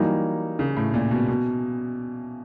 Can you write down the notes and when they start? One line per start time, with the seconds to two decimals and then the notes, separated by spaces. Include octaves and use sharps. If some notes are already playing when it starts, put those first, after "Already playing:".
Already playing: E3 F#3 G3 A#3 D#4
0.59 C#3
0.77 A2
0.94 A#2
1.11 B2
1.28 B2